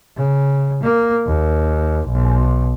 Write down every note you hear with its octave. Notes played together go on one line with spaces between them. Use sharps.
C#3
A#3
D#2
B1